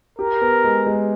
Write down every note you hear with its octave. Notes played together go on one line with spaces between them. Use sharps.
G4 A#4
B3
G#3
G#3